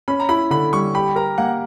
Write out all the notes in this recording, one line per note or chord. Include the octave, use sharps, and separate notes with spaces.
C#4 B5
A#5
E4 B5
D3 B5
G3 C#6
G4 B5
A#4 A#5
A#3 F#5